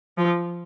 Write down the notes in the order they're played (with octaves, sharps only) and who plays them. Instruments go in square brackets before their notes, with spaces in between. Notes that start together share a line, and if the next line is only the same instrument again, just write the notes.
[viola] F3